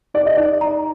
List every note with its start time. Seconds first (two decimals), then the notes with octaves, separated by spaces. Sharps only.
0.14 D#4 D5
0.26 D#5
0.37 D#4 D5
0.61 A#5